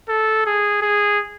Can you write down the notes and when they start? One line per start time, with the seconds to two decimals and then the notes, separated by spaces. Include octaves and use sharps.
0.09 A4
0.46 G#4
0.82 G#4